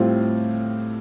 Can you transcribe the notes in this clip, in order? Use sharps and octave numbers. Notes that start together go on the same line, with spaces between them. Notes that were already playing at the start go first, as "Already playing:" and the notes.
Already playing: A2 G3 C4 F4